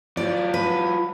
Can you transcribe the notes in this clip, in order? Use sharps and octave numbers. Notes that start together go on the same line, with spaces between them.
F#3 F4 D5
B4